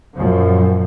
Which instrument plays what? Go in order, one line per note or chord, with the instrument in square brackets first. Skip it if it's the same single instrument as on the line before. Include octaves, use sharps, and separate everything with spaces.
[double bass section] F#2 A#2 F3